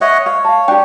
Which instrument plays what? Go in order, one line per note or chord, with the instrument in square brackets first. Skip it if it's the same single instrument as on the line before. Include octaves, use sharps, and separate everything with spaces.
[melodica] C#5 D#5 F#5 [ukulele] E5
[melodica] C#5 [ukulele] F5
[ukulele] F5 A5
[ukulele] D4 G4 [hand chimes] G5